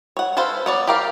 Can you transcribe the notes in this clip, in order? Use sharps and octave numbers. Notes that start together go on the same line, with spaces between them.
C#5 F#5
G#4 A4 B4 C5 F5
B3 C#5 D5
G4 A#4 F5